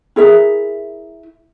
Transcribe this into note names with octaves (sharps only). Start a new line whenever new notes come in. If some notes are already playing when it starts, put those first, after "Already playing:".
E4 G#4 A#4 E5